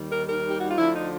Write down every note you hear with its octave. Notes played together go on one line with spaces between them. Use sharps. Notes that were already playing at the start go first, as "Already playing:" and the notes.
Already playing: D#2 D#3 G3
A#4
A#4
G4
F#4
F4
D2 D3 F3 E4
D#4